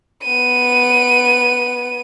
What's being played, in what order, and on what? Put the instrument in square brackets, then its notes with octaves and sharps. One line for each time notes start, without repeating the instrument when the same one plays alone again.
[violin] B3 D#7